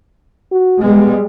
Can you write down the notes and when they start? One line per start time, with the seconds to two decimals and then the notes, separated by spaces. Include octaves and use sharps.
0.52 F#4
0.83 G3 G#3 B3